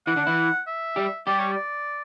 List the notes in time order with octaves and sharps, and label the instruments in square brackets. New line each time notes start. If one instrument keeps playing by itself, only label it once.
[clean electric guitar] E3 E4 [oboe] F#5
[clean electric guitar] D3 D4
E3 E4
[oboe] E5
[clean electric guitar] G3 G4
[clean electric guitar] G3 G4 [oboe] D5
[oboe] C#5
D5